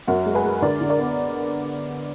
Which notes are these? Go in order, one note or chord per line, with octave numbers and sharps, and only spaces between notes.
F#2 F#4 A#4
G#3
G#4 B4
G#3
D3 A#4 D5
D3
A#4 D5
B3